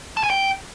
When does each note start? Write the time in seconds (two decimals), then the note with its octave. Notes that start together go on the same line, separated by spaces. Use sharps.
0.17 A5
0.23 G#5
0.30 G5